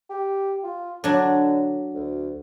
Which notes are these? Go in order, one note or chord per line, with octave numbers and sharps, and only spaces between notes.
G4
F4
D3 F#3 D4
D2